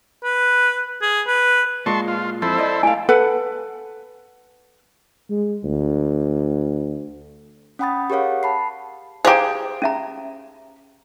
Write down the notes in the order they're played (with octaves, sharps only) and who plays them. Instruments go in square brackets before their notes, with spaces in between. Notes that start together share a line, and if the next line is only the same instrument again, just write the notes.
[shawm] B4
G#4
B4
[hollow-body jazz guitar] A#2 G#3 [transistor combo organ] A5 C6 C#6
[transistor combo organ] F4
[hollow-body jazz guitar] F2 [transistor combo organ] E4 A4 C5
[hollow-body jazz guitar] D5 D#5
[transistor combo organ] A3 [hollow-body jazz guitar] E4 F5 [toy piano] G#5
[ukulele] A4 B4 F#5
[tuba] G#3
D2
[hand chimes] C#4 F#5 G5 B5 D#6 A6
G4 G#4 A#4 C#5 F5 F#5
A5 B5 C7
[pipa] G4 G#4 [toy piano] C5 F5 A#5
[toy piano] C#4 E5 A#5